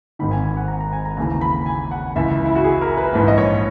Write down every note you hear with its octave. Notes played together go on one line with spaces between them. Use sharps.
G#1 G#2 D#3 B5
G#5
G#5
F#5
A#5
A#5
G#5
A#5
D#2 C#3 E3 A#5
B5
G#5
F#5
C#2 C#3 E3 E5
E4
F#4
G#4
A#4
B4
A#1 G#2 E3 B4
D#5
C#5